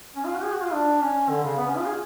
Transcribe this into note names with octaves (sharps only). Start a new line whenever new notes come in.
C#4
F4
F#4
G#4
F#4
F4
D4
C#4
D3
C#3
B3
C#4
F4
G#4